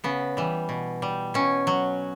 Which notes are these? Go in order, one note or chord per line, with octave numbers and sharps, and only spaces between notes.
C#3 B3
E3 G3
B2
G3
B2 C#4
F#3